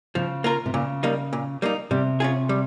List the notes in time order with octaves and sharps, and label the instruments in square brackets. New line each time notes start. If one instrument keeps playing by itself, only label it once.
[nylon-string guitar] C#3 [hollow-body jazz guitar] F3
[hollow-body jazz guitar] A#3 F4 A#4
[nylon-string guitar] C3
[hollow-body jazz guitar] A#2 [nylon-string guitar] C#3
[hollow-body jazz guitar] G3 A#3 D#4
A#2
G3 A#3 D#4
[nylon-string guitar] C3 [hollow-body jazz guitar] G3
[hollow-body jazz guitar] C#4 F4 G#4
G3